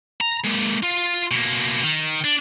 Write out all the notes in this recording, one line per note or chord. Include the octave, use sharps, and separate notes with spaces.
A#5
G#3 A#3
F4
B2 A#3
D#3
D4